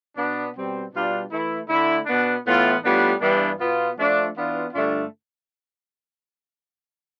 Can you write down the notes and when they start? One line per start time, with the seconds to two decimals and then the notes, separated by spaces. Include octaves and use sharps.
0.17 B2 B3 D4
0.55 B2 G3 C4
0.92 B2 G3 D4 F4
1.30 E3 A3 E4
1.69 D3 A3 E4
2.06 B2 B3 D4
2.45 A2 E3 B3 F4
2.82 A2 G3 B3 D4 F4
3.21 G2 E3 G3 B3 D4
3.59 B2 B3 F4
3.97 F3 A3 D4 F4
4.35 E3 B3 D4 F4
4.73 G2 D3 A3 D4 F4